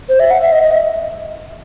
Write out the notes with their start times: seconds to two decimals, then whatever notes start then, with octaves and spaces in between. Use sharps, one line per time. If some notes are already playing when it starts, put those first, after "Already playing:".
0.09 C5
0.20 E5
0.31 F#5
0.41 E5
0.52 D#5
0.62 D#5
0.73 E5